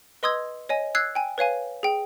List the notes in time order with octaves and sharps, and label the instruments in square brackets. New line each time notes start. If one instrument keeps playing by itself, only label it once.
[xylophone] B4 D#5 C6 D#6 E6 G#6
C#5 D#5 G#5
E6 F#6 G#6 C7
G5 G#5
B4 C#5 F5 G#5
G#4 G5